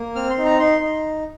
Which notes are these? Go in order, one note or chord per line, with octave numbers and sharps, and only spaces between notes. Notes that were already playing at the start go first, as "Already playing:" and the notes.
Already playing: A#3
C4 F6
C6
D#4
A#5
D#4 C6
D#4